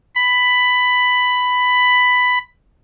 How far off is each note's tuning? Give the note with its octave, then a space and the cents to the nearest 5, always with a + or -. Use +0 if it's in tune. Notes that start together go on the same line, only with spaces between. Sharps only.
B5 +10